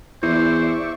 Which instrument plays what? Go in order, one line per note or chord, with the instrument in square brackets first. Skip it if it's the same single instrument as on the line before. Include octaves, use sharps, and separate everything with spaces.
[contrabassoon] E2 [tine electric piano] E4 [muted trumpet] C5 [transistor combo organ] D5 E5 C#6